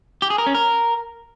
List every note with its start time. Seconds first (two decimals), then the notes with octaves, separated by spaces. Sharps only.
0.22 G4
0.30 G#4
0.38 A#4
0.46 C#4
0.55 A#4